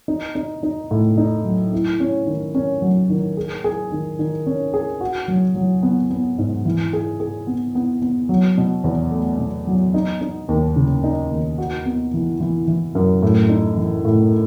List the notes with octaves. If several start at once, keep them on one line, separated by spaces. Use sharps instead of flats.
D#4
D#4
D#4
A2
D#4
F#3
E4
C#4
D#3
C#4
F#3
D#3
G#4
G#4
D#3
D#3
C#4
G#4
F#4
F#3
F#3
B3
B3
G#2
E3
G#4
G#4
B3
B3
B3
F#3
B2
E2
A3
B2
F#3
D#4
D#4
D#2
C#3
D#4
D#2
F#4
B3
E3
E3
E3
F#2
A2
D#4
E3
A2